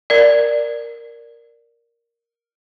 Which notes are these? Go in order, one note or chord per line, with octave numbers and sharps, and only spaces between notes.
A#4 D5